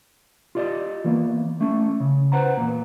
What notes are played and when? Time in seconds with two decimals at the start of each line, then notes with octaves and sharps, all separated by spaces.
0.55 F4 G4 D5 D#5
1.04 E3 A#3 B3
1.61 A3 C#4
2.00 C#3
2.32 B4 C5 F#5 A#5
2.57 E2 A#2